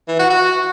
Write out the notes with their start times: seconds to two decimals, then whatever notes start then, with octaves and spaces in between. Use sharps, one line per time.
0.08 E3
0.19 F#4
0.30 F#4